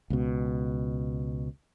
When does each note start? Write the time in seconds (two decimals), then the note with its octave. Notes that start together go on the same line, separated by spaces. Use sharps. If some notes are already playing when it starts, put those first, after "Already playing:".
0.10 C#2 B2